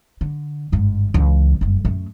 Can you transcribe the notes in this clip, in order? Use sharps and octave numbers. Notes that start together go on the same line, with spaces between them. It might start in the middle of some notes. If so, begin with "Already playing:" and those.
D3
G1 G#2
C#2 E3
F#1 G2
F#2 A3